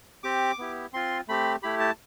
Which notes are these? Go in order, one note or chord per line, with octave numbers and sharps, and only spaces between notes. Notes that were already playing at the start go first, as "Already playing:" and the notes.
C4 G4 D6
B3 E4 G4
C4 F4 C6
A3 C4 G4 B5
A3 E4 G4 B5
A5